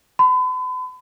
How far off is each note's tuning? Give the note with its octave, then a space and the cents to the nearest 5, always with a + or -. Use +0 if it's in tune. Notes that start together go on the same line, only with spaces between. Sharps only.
B5 +40